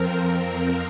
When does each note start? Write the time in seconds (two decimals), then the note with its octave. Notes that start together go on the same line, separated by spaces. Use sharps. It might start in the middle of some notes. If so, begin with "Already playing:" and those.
Already playing: F2 F3 C4 A#4
0.44 A#4